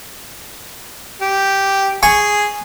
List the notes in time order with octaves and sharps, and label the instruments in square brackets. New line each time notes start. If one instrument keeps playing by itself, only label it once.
[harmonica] G4
[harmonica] G#4 [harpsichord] G#5 C#6